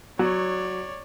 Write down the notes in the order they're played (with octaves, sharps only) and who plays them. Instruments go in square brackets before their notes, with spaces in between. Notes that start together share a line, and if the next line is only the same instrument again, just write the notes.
[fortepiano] F#3 [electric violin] C#5 D5